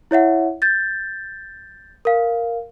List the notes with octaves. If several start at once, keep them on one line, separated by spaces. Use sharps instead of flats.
E4 C#5 E5 F#5
G6 A6
A#4 F5